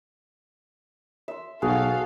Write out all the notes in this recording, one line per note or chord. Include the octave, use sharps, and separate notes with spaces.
E5 C6
B1 F#4 G#4 A4 F5